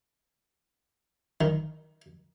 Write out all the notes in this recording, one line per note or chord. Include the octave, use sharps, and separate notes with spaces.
D#3